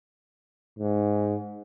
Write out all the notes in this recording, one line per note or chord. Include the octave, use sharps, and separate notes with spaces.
G#2